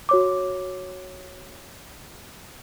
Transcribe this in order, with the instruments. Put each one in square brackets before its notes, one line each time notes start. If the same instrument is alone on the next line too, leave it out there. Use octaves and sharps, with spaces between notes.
[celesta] F#4 C#5 D6